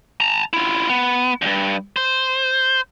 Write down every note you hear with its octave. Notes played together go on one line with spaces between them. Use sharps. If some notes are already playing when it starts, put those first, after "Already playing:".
A5 A#5
E4 F4
B3
D2 G2
C5